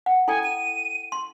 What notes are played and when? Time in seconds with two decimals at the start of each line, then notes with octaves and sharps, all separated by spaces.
0.06 F#5
0.28 E4 A4 G5 G#5
0.43 D#7
1.12 C6